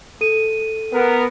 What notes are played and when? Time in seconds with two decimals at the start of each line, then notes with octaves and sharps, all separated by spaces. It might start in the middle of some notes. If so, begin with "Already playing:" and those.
0.21 A4 D#7
0.93 B3 A#4